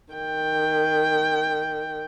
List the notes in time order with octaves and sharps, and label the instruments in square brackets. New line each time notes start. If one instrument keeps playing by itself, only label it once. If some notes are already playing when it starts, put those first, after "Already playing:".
[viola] D#3 G5